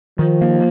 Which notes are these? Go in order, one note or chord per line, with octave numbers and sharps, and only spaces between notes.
D#3 F3
A#3